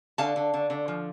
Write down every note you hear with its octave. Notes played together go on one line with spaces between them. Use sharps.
D3 F5 A5
D3
D3
D3
F3